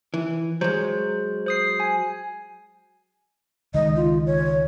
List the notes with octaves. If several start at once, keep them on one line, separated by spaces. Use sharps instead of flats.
E3
F#3 G#3 C5
C5 D#6 C7
G#5
C#2 D#3 G#3 D#5
F4
C#5